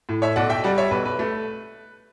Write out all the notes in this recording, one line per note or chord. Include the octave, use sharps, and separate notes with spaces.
A2
C#5 E5
B1 D5 F#5
E5 G5
G3 D5 F#5
C#5 E5
B1 B4
B4
A3